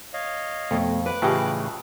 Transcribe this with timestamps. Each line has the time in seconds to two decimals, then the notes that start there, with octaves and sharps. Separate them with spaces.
0.13 C#5 D#5 F5
0.71 F2 B2 A3
1.06 B4 D6 F#6
1.22 A2 C#3 E3 F4 G4 D#5